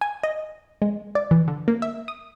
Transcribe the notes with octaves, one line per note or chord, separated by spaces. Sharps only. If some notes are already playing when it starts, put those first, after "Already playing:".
G#5
D#5
G#3
D5
E3
D3
A#3
E5
D#6